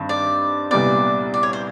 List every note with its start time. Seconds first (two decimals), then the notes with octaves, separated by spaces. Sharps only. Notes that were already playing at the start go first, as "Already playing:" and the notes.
Already playing: G2 D#3 C4
0.09 D5
0.71 C2 A#2 G3 B3 D5
1.34 D5
1.43 C#5
1.53 C5